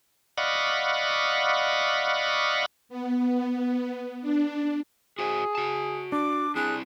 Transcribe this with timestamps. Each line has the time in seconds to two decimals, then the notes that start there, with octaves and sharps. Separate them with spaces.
0.38 D5 D#5 F5 F#5 B5 C#6
2.89 B3
4.21 D4
5.19 F#4 G#4 C5 D#5
5.55 F#4 A5
6.12 D4 D6
6.56 C4 E4 G#4 F#6